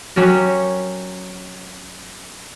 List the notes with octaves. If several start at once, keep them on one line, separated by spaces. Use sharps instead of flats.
F#3 C#4 G4 A#4